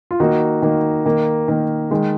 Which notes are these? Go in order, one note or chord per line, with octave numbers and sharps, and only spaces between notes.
F4
D#3 A#3 D#4 F#4
D#3 A#3
D#3 A#3
D#3 A#3
D#3 G#3